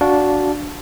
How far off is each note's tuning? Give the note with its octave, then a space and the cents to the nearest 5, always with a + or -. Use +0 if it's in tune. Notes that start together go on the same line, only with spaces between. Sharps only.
D4 -10 F#4 +0 F5 +10